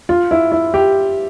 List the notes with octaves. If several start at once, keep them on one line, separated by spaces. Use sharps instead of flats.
F4
E4
E4
G4